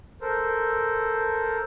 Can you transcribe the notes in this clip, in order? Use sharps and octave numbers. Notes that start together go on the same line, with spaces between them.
A4 A#4 C5